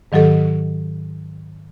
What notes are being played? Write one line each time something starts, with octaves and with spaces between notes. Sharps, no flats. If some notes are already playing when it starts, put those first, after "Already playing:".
G#2 D#3 F#3 G4 A4 D#5